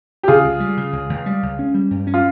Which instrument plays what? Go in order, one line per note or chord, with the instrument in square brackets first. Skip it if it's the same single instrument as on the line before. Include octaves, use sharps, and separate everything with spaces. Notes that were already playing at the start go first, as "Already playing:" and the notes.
[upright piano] G4
[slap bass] C#3 [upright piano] F4 G#4
[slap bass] C#2
G3
C#3
C#2
C#2
G3
C#2
C#4
G3
G2
C#4
[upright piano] F4